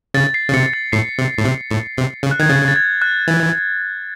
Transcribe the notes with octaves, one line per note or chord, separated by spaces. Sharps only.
C#3 A6
C7
C#3
C3 C#7
A6
A2 C7
C3
A2
C3
A2
C3
C#3
F#6
D#3 G#6
C#3 A6
A6
G#6
F#6
E3 F#6